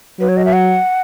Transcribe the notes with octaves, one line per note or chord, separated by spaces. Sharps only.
F#3 B4
C#5
D#5
E5
F#5